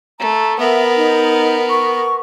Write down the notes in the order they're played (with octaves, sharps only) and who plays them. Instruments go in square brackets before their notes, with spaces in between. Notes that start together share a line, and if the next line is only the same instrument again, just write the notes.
[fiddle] A3 [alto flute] A#5
[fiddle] B3 A#4 [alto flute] E5
[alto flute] D#4
C#6